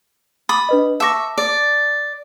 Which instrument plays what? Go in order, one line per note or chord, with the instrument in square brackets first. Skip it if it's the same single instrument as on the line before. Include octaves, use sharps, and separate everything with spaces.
[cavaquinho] B5 D#6 [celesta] D6 A6
[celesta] D4 B4 D#5
[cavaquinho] E5 C#6 [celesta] A5 D6 A#6
[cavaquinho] D5